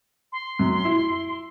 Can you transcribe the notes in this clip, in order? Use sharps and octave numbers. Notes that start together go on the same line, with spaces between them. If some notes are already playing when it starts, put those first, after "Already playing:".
C6
F#2
E4